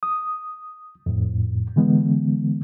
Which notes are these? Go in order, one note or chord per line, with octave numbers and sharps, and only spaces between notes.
D#6
F2 A2
D3 E3 G#3 B3